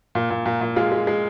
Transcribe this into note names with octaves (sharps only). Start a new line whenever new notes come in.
A#2
A#2
A#2
A#2
G#3 F4
G#3
G#3